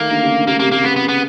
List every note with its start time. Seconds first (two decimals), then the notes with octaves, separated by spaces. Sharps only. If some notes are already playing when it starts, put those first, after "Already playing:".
Already playing: D#3 A3 A#3
0.10 D3
0.23 C#3
0.35 D3
0.47 C#3 A#3
0.59 C3 A#3
0.72 C#3 A#3
0.84 C#3 B3
0.96 B3
1.02 C#3
1.09 B3